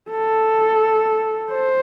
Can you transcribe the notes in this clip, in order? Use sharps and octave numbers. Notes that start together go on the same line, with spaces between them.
A4
C5